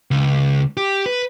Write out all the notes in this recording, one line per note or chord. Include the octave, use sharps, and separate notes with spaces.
C#2
G4
B4